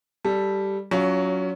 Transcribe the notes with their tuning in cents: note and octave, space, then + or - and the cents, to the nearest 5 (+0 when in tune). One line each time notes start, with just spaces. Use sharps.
G3 +0 A4 +0
F#3 +0 C#4 +25 F4 +0